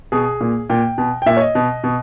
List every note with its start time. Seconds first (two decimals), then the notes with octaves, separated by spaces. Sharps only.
0.12 B2 G#4
0.41 A#2
0.69 A#2 G5
0.98 B2
1.22 G5
1.26 A#2 E5
1.37 C#5
1.41 D#5
1.55 B2
1.84 B2